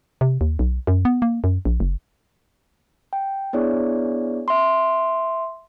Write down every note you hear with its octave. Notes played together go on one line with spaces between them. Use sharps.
C3
D#2
B1
F#2
B3
A#3
F#2
A#1
F#1
G5
B3 D4 E4 G#4 C#5 D5
E5 C6